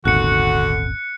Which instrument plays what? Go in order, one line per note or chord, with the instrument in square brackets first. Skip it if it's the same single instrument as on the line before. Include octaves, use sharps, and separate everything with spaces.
[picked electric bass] D#1 G#1 [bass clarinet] D3 [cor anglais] F#4 [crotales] F#6 C#7